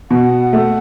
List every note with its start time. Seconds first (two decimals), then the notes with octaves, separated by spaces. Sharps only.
0.10 B2 F#5
0.53 A3